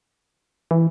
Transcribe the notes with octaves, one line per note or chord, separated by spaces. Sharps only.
E3